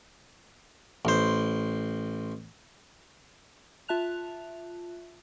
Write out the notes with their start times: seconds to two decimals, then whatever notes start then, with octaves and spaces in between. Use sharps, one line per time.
1.05 A1 C5
3.88 F4 E5 A5 F#6 F7